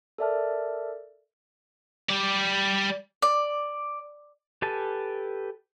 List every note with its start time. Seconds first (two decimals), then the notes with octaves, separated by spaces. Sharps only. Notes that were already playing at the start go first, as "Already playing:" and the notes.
0.18 A4 A#4 D5 E5 A5 F6
2.09 G3 D5
3.22 D5
4.62 G4 A4 B4 G#5 A5